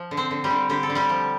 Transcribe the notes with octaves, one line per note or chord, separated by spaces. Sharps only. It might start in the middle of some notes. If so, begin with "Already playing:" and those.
Already playing: F3
D3
C4 C5
D3
G3 G4
D3
D3 G4
A4
D3
G3 G4
F3